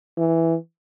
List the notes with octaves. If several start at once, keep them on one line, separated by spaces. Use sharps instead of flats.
E3